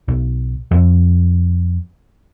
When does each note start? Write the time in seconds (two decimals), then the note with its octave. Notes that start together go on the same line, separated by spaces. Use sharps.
0.08 B1
0.71 F2